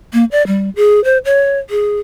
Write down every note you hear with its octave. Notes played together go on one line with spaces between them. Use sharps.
A#3
D5
G3
G#4
C5
C#5
G#4